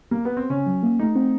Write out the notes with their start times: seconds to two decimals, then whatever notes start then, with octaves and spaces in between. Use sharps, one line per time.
0.11 A#3
0.25 B3
0.37 C4
0.50 C#3 C#4
0.66 F#3
0.83 A#3
0.99 A3 D#4
1.16 C4